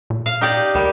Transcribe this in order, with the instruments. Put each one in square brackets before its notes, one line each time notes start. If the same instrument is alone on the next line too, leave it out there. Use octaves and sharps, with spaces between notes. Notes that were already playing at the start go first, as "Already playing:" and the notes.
[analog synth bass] A#2
[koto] F5
D#4 G4 D5
[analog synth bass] D2 [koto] D#3 G3